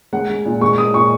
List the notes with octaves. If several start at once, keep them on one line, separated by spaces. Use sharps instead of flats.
G#3 F#5
G#3
A#2
G#3 C#6
G#3 D#6
A#2 C#6